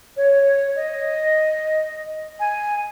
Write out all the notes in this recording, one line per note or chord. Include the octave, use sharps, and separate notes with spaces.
C#5
D#5
G#5